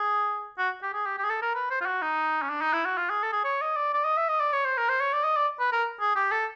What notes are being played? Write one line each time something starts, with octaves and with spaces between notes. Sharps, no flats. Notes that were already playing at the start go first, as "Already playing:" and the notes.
Already playing: G#4
F#4
G4
G#4
G4
G4
G#4
A4
A#4
B4
C5
F4
F#4
D#4
C#4
D4
D#4
E4
F#4
F4
G#4
A4
G#4
C#5
D#5
D5
D5
D#5
E5
D#5
D5
C#5
C5
A#4
C5
C#5
D5
D#5
D5
B4
A#4
G#4
G4
A4